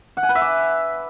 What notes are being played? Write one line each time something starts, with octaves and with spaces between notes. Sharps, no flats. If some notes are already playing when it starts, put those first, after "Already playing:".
F#5
G#5
B4
E5
D6